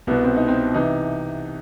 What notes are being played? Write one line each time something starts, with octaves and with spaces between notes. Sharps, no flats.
C2 B2 B3
C4
D#4
C4
C3 E3 D#4